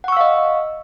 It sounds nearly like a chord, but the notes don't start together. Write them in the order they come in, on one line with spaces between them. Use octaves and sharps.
F#5 C#6 E6 F5 D#5